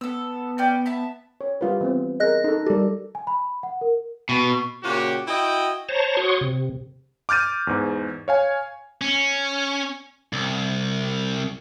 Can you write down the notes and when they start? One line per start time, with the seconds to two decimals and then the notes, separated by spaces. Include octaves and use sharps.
0.01 B3 A4 E6
0.58 C#4 D5 G5
0.86 E5 A5 B5
1.41 C#5
1.61 G3 F4 B4
1.81 E3 B3 C4
2.20 G#4 A#4 D#5 F#6 A#6
2.44 D#4 A4
2.66 G3 G4 A4 A#4
3.15 G#5
3.27 B5
3.63 F#5
3.81 A#4
4.29 B2
4.83 A#2 C#3 F#4 G4
5.28 E4 F#4 D#5 G5
5.89 C5 C#5 A5 A#5
6.17 F#4 C#5 C6 C#6 D#6
6.41 C3
7.29 D6 F6 G6 A6 D#7
7.67 E2 G#2
8.28 C#5 F5 G#5
9.01 C#4
10.33 C2